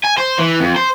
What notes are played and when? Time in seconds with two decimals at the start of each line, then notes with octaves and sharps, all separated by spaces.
0.05 G#5
0.18 C5
0.39 E3
0.60 F2
0.76 C5